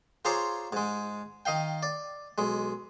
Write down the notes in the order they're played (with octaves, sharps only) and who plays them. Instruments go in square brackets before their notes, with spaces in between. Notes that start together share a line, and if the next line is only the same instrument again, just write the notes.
[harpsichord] F4 G#4 C5 C#5 A#5 D6
G#2 G#3
D#3 D#5 F5 G5
D5
B1 G#3